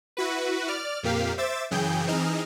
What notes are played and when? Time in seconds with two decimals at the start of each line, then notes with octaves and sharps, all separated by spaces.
0.17 E4 F#4 B4
0.68 D5 F6
1.03 F2 A#2 A#3 G4 F5 B6
1.38 C5 E5 D6 E6 A6
1.71 F#2 C#3 E3 G#4 G5 G6
2.07 E3 C4 D#4 G#4 D#5 F6